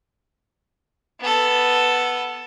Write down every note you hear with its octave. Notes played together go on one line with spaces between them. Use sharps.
B3 A4